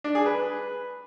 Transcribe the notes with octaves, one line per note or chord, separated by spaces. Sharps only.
D4
G#4
B4